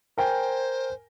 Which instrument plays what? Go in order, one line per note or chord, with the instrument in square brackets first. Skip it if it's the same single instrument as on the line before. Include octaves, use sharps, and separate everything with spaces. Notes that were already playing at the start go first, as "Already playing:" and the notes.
[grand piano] A#4 G5 G#5 [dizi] C5